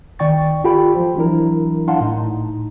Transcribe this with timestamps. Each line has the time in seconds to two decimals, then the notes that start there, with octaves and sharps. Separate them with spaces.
0.19 C2 D#3 D5 G5 C#6 A6
0.64 F4 G4 A4 G5 B5
0.95 F3 C5
1.15 E3 F#3 D4 E4 A#4
1.88 D4 E4 F5 F#5 A5 C6
2.00 A2 D#4